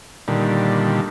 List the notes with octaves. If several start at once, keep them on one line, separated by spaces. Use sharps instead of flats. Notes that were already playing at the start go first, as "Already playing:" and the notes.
A#2 D3 D#3 G3